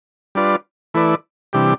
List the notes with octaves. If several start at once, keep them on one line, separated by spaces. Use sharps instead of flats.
G3 D4 F4 B4 D5
E3 A3 E4 B4 D5
C3 E3 G3 D4 G4